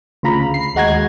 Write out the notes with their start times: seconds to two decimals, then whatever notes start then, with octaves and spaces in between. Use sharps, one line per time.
0.23 D2 C#3 F4 A#5 B5
0.54 C7
0.75 D#2 G#3 F#4 A#5 G#6